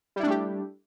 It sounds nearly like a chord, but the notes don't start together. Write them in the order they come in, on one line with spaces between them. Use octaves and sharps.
G3 E4 D4 A3 G4